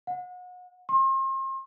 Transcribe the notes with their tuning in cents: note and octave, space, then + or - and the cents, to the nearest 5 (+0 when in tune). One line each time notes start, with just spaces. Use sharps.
F#5 -35
C6 +40